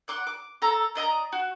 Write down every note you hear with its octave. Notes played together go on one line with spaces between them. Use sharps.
F#5 C6 D6 F#6
D6
A4 A#5
D4 D#5 E5 A#5
F#4